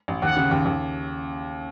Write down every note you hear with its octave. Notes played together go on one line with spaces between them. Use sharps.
A1
D#2 F#5
C#3
D#2
D#2